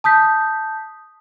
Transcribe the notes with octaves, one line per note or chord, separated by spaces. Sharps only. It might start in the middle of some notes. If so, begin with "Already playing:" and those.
A5 D#6 G6 B6